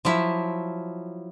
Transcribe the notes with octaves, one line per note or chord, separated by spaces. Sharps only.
F3 F#3 E4